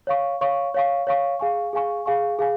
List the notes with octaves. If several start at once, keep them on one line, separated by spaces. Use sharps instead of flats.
C#5 F5 C#6
C#5 F5 C#6
C#5 F5 C#6
C#5 F5 C#6
G#4 F5 G#5 C#6
G#4 F5 G#5 C#6
G#4 F5 G#5 C#6
G#4 F5 G#5